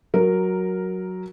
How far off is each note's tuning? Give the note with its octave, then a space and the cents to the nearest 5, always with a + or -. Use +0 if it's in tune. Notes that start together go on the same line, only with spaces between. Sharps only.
F#3 +0 A#4 +0